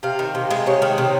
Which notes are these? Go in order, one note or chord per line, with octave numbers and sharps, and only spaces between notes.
C3 F5
D#3
C3
G#3
C3 C#5
D#3
C3